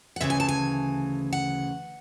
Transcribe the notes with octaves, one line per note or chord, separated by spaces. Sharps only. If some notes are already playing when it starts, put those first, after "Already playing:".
F#5
D2 C#3 E3 E5
G#5
A5
G#5
F#5